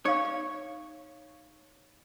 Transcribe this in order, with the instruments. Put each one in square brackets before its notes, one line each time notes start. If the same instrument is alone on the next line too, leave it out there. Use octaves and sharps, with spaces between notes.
[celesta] D#4 F5 [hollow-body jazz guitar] C#5